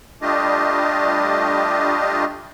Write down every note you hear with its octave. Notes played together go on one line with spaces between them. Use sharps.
G3 A3 D4 F4 G4 D#5